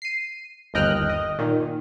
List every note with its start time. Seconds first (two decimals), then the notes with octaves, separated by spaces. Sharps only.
0.02 C7 D#7
0.74 G1 D#2 D#5 G5 F6 F#6
1.09 D#5
1.38 A#2 D#3